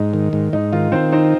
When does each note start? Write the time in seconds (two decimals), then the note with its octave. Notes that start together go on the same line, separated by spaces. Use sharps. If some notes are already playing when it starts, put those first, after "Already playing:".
Already playing: G#2 D#4
0.14 D#3
0.33 G#2
0.53 G#2 D#4
0.72 D#3 F4
0.92 D#3 C4 C5
1.12 C4 D#4 C5